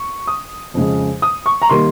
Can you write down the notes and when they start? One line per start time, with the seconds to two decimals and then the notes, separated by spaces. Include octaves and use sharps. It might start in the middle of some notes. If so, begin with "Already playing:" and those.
Already playing: C#6
0.27 D#6
0.74 F2 C#3 G#3
1.22 D#6
1.46 C#6
1.62 A#5
1.70 D#3 G3 A#3 C6